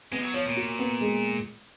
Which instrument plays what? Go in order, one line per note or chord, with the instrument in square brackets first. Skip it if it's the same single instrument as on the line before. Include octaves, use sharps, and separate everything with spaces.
[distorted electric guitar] G#3 [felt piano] B3
[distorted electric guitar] F3
F#3
[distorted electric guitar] F3 [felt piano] C#5
[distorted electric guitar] A#2
[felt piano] F#4
B3
G#3